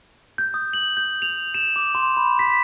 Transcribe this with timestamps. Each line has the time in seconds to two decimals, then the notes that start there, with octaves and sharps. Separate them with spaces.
0.38 G6
0.54 D#6
0.73 F#7
0.97 G6
1.22 F7
1.54 E7
1.76 D6
1.95 C6
2.17 B5
2.39 B6